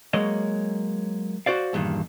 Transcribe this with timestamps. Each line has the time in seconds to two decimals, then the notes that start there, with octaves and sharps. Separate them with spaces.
0.13 F#3 G#3 A#3 C#5 D#5
1.46 F#4 C5 D5 F5
1.73 E2 G2 A#2 D#3